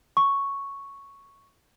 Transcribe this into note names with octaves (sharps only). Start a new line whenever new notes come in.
C#6